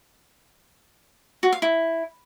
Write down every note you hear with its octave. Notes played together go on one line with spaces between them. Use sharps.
F#4
F5
E4